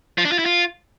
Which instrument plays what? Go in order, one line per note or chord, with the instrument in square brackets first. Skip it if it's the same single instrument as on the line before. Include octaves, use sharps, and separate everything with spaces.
[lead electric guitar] F3
D4
F4
E4
F4